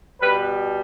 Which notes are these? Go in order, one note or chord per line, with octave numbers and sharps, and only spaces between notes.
B2 G3 B4